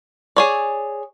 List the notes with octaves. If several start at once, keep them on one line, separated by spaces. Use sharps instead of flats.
G#4 C#5 D5